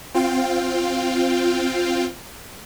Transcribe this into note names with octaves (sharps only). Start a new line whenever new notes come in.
C4 F4 F5 G5